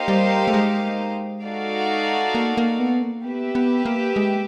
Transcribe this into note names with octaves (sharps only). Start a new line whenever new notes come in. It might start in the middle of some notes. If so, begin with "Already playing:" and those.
Already playing: A#3 D#4 G4 C5 F5
G3
A3
G#3
D#4 F#4 A4 D5 F5
A#3
A#3
B3
A#3
B3 G4 B4 E5
B3
A#3
G#3